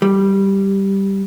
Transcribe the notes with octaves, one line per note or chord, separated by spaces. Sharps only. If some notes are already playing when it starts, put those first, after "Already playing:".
G3